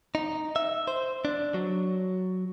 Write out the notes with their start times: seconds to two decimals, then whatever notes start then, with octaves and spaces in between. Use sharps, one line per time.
0.15 D#4
0.56 E5
0.87 C5
1.25 D4
1.54 F#3